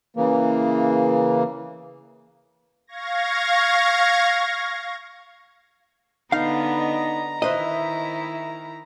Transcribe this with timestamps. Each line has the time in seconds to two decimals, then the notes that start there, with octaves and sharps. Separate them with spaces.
0.16 C#3 E3 A#3
2.87 F5 C#6 G#6 A#6
6.32 D3 B3 D#4 F5 A#5
6.77 D#5
7.42 D#3 E4 B4 C5 D#5 E5